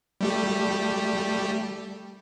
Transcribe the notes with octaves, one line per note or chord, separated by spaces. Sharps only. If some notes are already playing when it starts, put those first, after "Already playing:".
G3 A3 G4